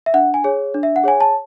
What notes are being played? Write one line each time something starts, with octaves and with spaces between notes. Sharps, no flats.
E5
D4 F#5
G#5
G#4 C#5
D4
E5
F#5
G#4 C#5 G#5
A5